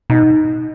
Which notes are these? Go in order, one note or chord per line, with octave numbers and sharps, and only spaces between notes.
B2 D#4